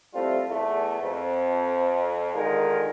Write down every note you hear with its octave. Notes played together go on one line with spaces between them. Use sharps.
G3 A3 C4 E4 F4
E2 A3
F2
D3 D#3 G#3 D#4 F4 A#4